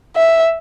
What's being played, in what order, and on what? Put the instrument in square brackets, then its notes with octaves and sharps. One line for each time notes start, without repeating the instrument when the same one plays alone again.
[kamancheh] E5